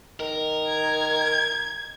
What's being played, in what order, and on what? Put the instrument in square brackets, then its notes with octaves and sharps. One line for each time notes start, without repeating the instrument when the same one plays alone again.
[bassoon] D#3 [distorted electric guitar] A#4
[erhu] G#6